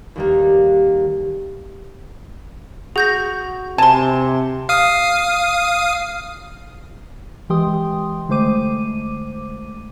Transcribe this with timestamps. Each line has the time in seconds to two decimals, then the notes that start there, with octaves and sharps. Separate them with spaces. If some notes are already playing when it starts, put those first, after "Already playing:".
0.15 D#2 G3 A#3
2.96 F#4 G#4 G6 A#6
3.78 C3 G#5 A5 C6
4.69 F5 D#6
7.49 E3 G#3 G4 G5 C6 D#6
8.29 D3 G#3 A3 C5 D6 D#7